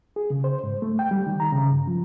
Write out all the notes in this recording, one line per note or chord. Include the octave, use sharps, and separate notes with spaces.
G#4
C#3
C5
G#2
A3
G5
G3
D#3
A#5
C#3
G2
F3